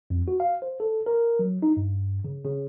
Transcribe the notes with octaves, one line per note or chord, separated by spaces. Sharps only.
F2
F#4
F5
C5
A4
A#4
F#3
D#4
G2
C#3
C#3